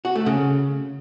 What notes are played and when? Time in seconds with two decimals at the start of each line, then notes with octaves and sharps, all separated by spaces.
0.05 F#4
0.15 A3
0.26 C#3